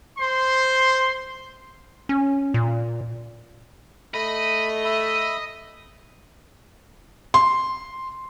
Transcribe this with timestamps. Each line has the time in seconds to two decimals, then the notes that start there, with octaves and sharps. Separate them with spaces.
0.18 C5 C6
2.09 C#4
2.54 A#2
4.14 A3 D#5 B5
4.85 E5 B5
7.34 C6